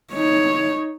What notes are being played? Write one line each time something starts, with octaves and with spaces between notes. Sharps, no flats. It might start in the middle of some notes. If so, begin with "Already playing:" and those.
D#4 C#5